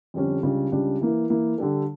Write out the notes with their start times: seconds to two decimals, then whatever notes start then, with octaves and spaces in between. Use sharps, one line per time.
0.14 F2 D3 G3 C#4
0.43 C#2 C#3 G3 D4
0.72 C#2 C#3 G3 D4
1.01 E3 A#3 E4
1.30 E3 A#3 E4
1.58 D3 G3 D4 A4